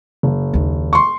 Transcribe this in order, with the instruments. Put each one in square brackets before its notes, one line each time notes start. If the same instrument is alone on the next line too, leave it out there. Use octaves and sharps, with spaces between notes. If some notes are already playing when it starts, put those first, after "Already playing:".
[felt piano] F#1
[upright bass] D#2 D#3
[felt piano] C6 C#6